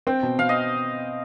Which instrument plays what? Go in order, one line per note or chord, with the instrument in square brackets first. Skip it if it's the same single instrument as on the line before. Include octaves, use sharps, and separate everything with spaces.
[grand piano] C4 [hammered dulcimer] G5
[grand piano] B2
[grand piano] B2 [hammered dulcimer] F5
[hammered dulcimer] D#5